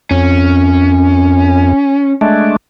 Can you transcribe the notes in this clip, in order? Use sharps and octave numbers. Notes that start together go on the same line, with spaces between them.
F2 C#4
G#3 A3 D4